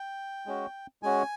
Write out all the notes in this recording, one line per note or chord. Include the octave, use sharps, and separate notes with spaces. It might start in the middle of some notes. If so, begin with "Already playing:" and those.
Already playing: G5
G#3 C#4 F#4
G#3 C#4 F#4 G#5